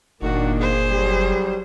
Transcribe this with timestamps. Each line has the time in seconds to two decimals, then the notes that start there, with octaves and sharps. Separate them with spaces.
0.22 F#1 A#2 D#3 A#3 D4 F#4
0.60 G#4 C5
0.89 F#3 G3